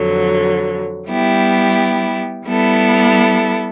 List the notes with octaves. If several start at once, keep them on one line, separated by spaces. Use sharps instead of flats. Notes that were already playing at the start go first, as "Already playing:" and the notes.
Already playing: F2 D3 F#3
G3 B3 E4 G4
G3 B3 E4 A4